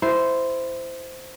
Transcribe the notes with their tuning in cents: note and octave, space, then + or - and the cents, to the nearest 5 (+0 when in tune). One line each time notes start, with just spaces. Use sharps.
E4 +0 C5 -10